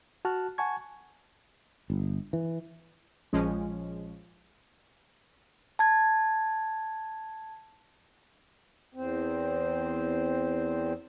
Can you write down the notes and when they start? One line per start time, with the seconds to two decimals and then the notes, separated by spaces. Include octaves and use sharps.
0.25 F#4 A5 F6 F#6
0.58 F#5 G#5 A5 C#6 G#6
1.90 G1
2.33 E3
3.33 A#1 F3 G#3 C#4
5.79 A5 G#6
8.94 E2 C4